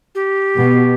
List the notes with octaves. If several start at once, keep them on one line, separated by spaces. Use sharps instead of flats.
G4
B2